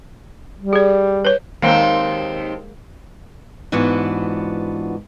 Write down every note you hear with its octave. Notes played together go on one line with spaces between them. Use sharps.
G3
G#4 D5
B4 C#5
D#2 G#3 A#3 C4 D#4
G#2 E3 B3 D4 F4 F#4